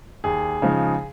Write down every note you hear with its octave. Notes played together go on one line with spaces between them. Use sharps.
D#2 G#4
C#3 F3 G#3 D#4